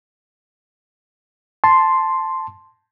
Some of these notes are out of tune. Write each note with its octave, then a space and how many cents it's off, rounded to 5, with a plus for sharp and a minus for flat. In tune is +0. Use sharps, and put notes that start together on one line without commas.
A5 +0 C6 +0